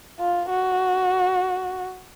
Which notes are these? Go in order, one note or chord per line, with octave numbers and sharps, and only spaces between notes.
F4
F#4